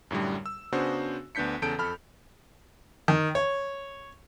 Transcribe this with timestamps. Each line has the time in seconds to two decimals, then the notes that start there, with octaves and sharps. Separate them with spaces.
0.11 F#2 A2 D3 G3
0.46 E6
0.72 C#3 B3 D4 F#4 G#4 C5
1.35 D2 B3 D4 G6 B6 C#7
1.62 E2 C#3 A4 A5 G6 D7
1.78 F2 A4 B5 F6
3.08 D#3
3.35 C#5